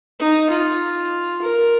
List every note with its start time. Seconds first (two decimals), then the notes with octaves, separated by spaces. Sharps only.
0.19 D#4
0.50 F4
1.42 A#4